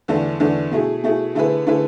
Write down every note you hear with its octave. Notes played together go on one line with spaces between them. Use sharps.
E2 D3 A3 D4
E2 D3 A3 D4
B2 A3 E4 G#4
B2 A3 E4 G#4
D3 A3 E4 G#4 B4
D3 A3 E4 G#4 B4